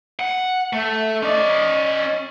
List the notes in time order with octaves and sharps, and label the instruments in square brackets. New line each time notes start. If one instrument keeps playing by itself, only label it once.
[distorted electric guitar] F#5
[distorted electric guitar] A3 [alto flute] E5
[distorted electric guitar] C#4 D5 [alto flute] D#5